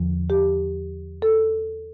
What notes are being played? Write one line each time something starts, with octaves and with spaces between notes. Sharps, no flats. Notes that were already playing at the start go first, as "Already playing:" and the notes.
Already playing: E2 D3 F3
G4
A4